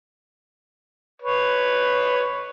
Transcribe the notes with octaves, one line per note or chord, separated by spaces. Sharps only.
B4 C#5